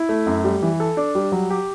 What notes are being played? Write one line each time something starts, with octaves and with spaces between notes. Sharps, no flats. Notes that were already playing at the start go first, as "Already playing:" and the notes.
Already playing: E4
A3
F#2
G3
E3
A4
D4
G3
F#3
G4